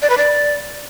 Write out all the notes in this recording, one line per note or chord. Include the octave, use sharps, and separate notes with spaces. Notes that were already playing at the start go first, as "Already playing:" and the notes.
D5
B4
D5